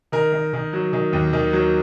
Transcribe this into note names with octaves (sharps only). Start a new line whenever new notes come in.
D#3 A#4
D#3
D#3
F#3
D#3
D#2
D#3
F#3